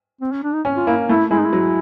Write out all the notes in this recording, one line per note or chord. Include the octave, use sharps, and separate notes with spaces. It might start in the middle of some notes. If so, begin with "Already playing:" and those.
C4
C#4
D4
D#4
C#4
F4
A#3 E4
A3 E4
G#3 E4
D#4
E4
F#3